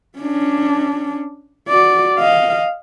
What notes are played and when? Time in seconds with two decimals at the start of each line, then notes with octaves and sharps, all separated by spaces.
0.19 C#4 D4
1.68 F#4 D5
2.19 D#5 F5